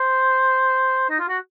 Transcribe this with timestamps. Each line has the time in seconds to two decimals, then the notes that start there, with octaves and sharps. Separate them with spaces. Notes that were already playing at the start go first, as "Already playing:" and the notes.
Already playing: C5
1.10 D#4
1.20 F4
1.29 F#4